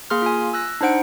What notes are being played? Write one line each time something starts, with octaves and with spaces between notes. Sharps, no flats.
A#3 G#4 C6 F6
F4 G#5
E6 F#6 A#6
D4 D#4 C5 F#5 D7